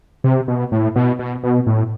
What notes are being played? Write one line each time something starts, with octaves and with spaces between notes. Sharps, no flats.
C3
B2
A2
B2
B2
B2
A2